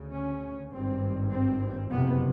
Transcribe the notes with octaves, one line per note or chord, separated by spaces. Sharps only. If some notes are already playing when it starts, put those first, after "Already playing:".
Already playing: D2 C#3
C#4
G#1 G2 C4
C4
F#1 F2 C3 B3